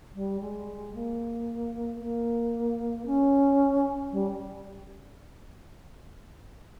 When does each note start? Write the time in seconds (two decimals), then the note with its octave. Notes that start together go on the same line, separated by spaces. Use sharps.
0.15 G3
0.40 G#3
0.94 A#3
2.00 A#3
3.06 C#4
4.12 G3